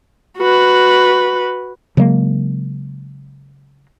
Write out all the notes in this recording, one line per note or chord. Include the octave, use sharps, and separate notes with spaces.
F#4 B4
C#3 F#3 G#3 A#3